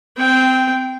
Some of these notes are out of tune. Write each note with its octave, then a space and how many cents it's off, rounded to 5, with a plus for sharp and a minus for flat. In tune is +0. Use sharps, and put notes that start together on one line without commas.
C4 -20 G5 +0